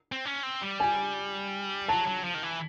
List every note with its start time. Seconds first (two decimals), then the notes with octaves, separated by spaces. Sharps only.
0.12 C4
0.25 C#4
0.43 C4
0.62 G3
0.80 G#5
1.89 F#3 A5
2.07 F#3
2.24 F3
2.35 D#3
2.43 E3